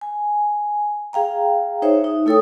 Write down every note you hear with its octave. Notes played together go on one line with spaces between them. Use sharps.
G#5
G#4 F5 G5 A#5
D#4 G#4 C5 C#5 E5
D#4
A3 E4 A4 C#5 G5 D#6